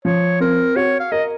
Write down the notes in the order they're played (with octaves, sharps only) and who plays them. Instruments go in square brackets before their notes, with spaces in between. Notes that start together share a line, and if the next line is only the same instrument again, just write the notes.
[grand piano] F3 [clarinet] C#5
[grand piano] C4 [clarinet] A#4
[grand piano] F#4 [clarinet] C#5
[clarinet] F5
[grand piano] A#4 [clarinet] D#5